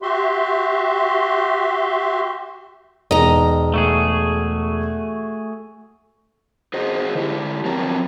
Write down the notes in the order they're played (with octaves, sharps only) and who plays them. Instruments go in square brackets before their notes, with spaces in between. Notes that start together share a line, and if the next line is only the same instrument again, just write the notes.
[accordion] F#4 G4 E5 C6
[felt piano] E1 [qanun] D#4 A#5
[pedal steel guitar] A3 F#4 G#4
[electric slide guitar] F#4 G#4 C5 D#5
D3 E4 G4
F3 F#3 C4 A#4 C#5 A5